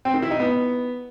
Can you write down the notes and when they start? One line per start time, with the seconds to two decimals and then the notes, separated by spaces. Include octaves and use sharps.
0.05 C4
0.14 D#3
0.22 E4
0.31 D#4
0.40 B3